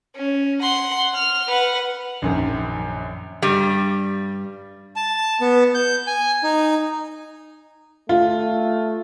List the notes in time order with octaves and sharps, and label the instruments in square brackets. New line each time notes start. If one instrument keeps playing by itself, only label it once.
[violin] C#4
F#5 C6
F6
B4 F#5
[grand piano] A#1 F#2 D#3
[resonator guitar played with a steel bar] G2 G3
[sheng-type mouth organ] A5
B3
G6
G#5
D#4
[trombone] A3 [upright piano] F4